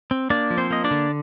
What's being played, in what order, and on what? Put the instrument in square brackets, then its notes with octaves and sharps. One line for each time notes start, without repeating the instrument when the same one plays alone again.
[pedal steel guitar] C4
A#3 D4 D5
F3
C4 C5
A#3 D#5
D4 D5
D3